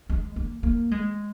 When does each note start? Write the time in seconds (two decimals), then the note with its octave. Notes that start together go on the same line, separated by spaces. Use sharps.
0.09 G#3
0.36 A#3
0.63 A#3
0.91 G#3